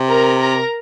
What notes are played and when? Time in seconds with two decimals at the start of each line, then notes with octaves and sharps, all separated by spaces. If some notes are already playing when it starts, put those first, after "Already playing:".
Already playing: C3
0.09 A#4 A#5
0.39 A#4 A#5